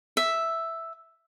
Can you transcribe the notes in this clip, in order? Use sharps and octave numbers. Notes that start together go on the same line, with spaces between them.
E5